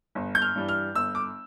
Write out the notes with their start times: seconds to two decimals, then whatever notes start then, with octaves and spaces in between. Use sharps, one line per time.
0.15 G1
0.35 G6
0.42 F6
0.55 G2 E3 G3
0.69 F6
0.95 G1 E6
1.15 D6